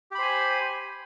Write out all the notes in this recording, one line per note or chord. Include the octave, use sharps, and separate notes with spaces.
G4 C5 G#5 B5